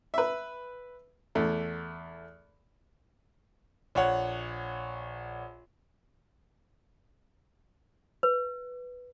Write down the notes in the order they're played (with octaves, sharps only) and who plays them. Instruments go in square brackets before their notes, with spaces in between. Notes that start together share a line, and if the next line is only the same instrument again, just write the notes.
[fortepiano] B4 E5
E2 A3
[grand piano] A#1 C#5 F#5
[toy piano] B4